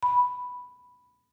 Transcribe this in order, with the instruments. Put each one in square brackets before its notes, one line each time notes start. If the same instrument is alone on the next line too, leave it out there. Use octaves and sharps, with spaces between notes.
[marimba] B5